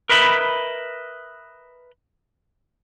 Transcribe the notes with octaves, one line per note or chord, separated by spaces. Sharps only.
A#4 B4 D#5 E5 B5